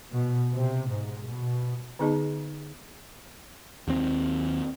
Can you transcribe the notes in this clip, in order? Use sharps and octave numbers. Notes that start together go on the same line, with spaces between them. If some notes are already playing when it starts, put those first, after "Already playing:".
B2
C3
G#2
B2
D3 B3 D#4 G#4 D#5 A5
D#2 C4